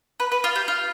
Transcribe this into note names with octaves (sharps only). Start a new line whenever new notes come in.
B4
B4
F4
G4
F4